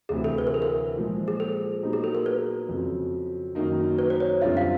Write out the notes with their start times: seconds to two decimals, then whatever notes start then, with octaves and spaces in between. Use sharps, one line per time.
0.09 D2 C3 E3 G#4
0.24 A4
0.38 B4
0.47 A#4
0.54 A4
0.62 A#4
0.97 A#2 F3 G#3
1.28 G#4
1.40 A4
1.83 A#2 F#3 B3 D#4 G4
1.93 G#4
2.04 A4
2.15 A#4
2.26 B4
2.69 F2 C#3 F#3
3.55 F#2 D#3 F#3 A#3 D#4
3.99 B4
4.10 C5
4.20 C#5
4.42 F#2 D3 G3 C4 F4 E5
4.57 F5